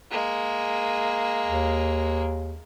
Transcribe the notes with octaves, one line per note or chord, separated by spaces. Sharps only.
G#3 A#3
D#2